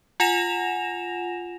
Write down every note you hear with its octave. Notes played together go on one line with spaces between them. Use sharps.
F4 F#5 G#5 A#6 E7 F7